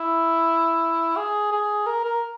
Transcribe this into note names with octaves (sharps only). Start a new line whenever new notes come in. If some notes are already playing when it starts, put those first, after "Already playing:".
Already playing: E4
G#4
G#4
A#4
A#4